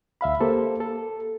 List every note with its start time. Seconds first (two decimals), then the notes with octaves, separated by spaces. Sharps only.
0.21 D2 E5 F5 B5
0.40 A#3 G4 A4 C5
0.80 A4